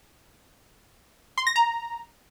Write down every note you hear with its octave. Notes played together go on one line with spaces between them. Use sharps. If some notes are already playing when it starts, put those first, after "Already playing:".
C6
A#6
A#5